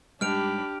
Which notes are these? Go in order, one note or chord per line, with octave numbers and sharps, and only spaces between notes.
G#2 G3 D4 G4 B5 F6 D7 F7